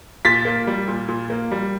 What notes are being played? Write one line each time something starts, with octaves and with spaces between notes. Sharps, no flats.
A#2 A6 B6
A#3
G3
A#2
A#2
A#3
G3